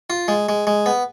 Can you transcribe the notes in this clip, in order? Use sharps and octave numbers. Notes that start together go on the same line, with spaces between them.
F4
G#3
G#3
G#3
B3